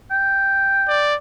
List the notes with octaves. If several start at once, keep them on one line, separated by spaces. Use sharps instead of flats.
G5
D5